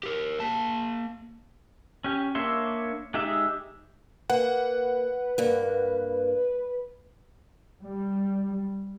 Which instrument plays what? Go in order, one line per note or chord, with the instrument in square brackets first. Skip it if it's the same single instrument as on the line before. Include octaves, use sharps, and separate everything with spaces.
[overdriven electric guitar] G4 A#4
A#3 A5
[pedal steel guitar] C#4 G4
A#3 D4 C#5 E5 C6
G#3 D#4 G4 E5
[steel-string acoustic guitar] A#3 [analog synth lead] B4 [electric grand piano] F#5
[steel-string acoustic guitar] G2 A#3
[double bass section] G3